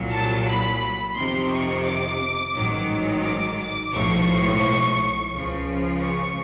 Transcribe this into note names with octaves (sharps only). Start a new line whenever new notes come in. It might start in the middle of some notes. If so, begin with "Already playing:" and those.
Already playing: C2 A#2 F#3
A5
B5
F2 C3 D#3 C6
C#6
D6
A1 G#2 D#3 F#3
D6
D6
B1 A2 F3 C#6
C#2 C#3 F3
C#6